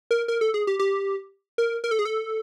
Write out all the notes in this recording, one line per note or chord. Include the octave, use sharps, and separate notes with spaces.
A#4
A#4
A4
G#4
G4
G4
A#4
A#4
A4
G#4
A4